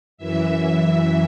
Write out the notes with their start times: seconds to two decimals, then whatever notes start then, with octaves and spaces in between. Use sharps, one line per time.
0.17 F#2 E3 E5